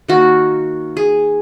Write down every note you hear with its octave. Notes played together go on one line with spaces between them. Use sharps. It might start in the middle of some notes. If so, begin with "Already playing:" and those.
D#3 A#3 F#4
G#4